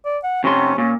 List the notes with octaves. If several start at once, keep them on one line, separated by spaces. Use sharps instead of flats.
D5
F#5
F2 C3 C#4 C6
A#2 C#4